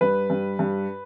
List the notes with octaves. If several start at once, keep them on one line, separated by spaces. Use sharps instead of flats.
G2 B4
G2
G2